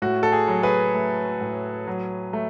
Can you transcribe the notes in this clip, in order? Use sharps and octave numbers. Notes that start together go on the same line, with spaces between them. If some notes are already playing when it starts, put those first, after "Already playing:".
A2 F#4
A4
G#4
F#3
G#4 B4
A3
A2
F#3
A3